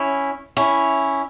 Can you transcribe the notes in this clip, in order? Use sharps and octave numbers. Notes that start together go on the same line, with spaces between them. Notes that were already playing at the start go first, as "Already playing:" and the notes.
Already playing: C#4 E4
C#4 E4